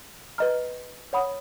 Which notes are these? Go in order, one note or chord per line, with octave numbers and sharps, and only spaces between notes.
B4 D#5 A#5 F6
C#5 F#5 B5 D#6